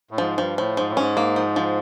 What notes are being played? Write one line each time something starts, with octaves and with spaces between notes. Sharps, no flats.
A2
G#2 F3
G2 F3
A2 F3
G#2 F3
A2
G#2 C#4
A#3
F3
F3